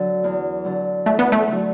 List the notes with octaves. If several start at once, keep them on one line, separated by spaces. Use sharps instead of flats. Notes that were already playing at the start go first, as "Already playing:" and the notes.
Already playing: D3 F#3
E2
D3 F#3
E2 A3
B3
A3
D3 F#3